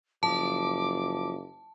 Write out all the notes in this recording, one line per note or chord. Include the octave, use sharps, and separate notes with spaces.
F#1 F3 A5 D6